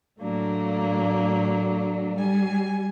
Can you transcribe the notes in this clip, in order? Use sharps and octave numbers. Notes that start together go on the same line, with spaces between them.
A2 F#3 A3 A#3 D4
G3 G#5